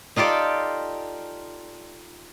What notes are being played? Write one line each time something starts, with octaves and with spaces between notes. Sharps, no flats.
D#4 F4 G4 A4 D5